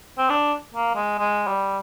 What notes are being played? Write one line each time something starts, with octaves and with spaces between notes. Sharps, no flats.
C4
D4
A#3
G#3
G#3
G3